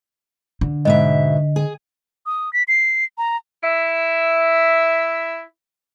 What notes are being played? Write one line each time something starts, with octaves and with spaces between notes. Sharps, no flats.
D3
G#2 B2 D#5 E5
G#4
D#6
B6
C7
A#5
E4 E5